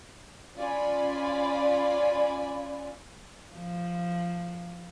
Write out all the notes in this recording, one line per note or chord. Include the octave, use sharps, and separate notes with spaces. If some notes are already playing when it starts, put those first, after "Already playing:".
C#4 F4 D5 G#5 B5
F3